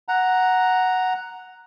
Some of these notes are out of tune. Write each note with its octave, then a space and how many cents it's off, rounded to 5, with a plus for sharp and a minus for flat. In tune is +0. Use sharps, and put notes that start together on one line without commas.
F#5 +0 A#5 +0